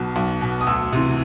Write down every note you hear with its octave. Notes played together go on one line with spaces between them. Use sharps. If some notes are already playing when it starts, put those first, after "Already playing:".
Already playing: B1 B2
B1
B2
D#6
D2 E6
C3 E3